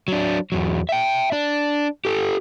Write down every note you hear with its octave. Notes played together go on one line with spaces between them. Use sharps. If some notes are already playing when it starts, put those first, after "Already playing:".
F#3 D4
E2 F#3
E5 G5
D4
G4 A4